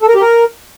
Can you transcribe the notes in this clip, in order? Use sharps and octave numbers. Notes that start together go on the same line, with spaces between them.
A4
A#4
G4
A#4